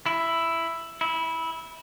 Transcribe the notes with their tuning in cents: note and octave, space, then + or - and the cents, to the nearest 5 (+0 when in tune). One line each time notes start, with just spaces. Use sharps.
E4 +5
E4 -15